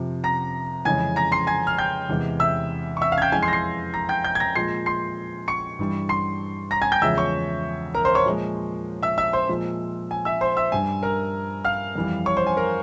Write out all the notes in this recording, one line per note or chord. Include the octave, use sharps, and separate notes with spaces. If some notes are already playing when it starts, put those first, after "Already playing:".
Already playing: F2 C3 F3
A#5 A#6
F2 C#3 E3 G#3 G#5 G#6
A#5 A#6
C6 C7
G#5 G#6
F6
G5 G6
E2 C3 E3 G#3
E5 E6
C#6
E5 E6
F5 F6
G#6
G5 G6
F2 E3 G#3 G#5 G#6
C6 C7
A#6
C6 C7
A#5 A#6
G5 G6
G5 G6
G#6
A#5 A#6
A#2 F3 G#3 C6 C7
C6 C7
C#6 C#7
G2 E3 G3
C6 C7
A#5 A#6
G#5 G#6
G5 G6
E2 C#3 F3 G#3 E5 E6
C#5 C#6
A#4 A#5
C5 C6
C#5 C#6
A#2 F3 G#3
E5 E6
E5 E6
C5 C6
A#2 F3 G#3
G#5
E5 E6
C5 C6
E5 E6
G2 G3 G#5
A#4 A#5
F5 F6
F2 E3 G3
C#5 C#6
C5 C6
G#5
A#4 A#5